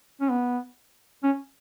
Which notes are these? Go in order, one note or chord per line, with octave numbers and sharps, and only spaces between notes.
C#4
B3
C#4